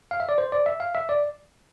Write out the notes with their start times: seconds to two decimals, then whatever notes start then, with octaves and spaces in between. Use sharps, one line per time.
0.11 F5
0.20 E5
0.29 D5
0.38 C5
0.52 D5
0.66 E5
0.80 F5
0.95 E5
1.09 D5